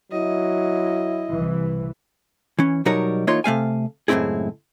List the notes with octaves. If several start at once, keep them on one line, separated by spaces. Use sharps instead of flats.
F#3 E4 D#5
C2 E3
E3 C#4
B2 F#3 G3 D#4 A#4 C#5
E3 A#3 D#4 F4 C#5 C6
C3 A3 F5 G#5
C#2 F#2 A2 C4 E4 G#4